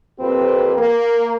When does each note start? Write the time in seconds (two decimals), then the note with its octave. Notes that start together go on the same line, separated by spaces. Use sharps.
0.19 F2 A#3 C4 G4 B4
0.77 A#3 A#4